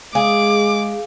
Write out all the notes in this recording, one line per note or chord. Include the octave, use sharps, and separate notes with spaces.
G#3 G#4 F5 D6